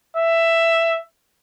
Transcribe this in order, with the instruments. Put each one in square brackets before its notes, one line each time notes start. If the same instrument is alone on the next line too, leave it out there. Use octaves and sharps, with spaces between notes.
[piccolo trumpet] E5